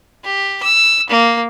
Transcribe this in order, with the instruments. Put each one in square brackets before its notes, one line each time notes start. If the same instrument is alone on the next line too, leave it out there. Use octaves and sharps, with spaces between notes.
[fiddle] G4
E6
A#3